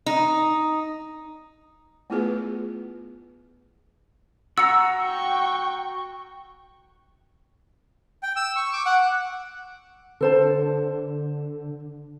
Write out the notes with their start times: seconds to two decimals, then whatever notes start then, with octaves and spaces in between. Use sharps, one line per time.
0.06 D#4
2.10 A3 B3 E4 F4 G#4 B4
4.58 F#4 F#5 A#5 E6 C#7
5.01 G5 C#6
8.23 G5
8.36 E6
8.56 C#6
8.73 D6
8.86 F#5
10.21 D3 A4 C5 A5